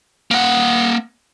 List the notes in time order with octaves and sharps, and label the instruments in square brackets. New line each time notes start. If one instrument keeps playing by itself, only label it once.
[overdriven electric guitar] A#3 F#5